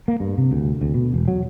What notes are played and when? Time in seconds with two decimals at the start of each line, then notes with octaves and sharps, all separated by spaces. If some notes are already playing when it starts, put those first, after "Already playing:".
0.08 A#3
0.20 G2
0.38 C3
0.52 D2
0.81 D2
0.94 B2
1.14 E1
1.28 F#3